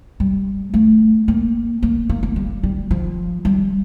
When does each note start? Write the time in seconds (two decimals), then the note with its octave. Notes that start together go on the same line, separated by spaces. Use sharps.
0.20 G3
0.74 A3
1.28 A#3
1.83 A#3
2.10 A#3
2.23 A#3
2.36 G3
2.63 G3
2.91 F3
3.45 G3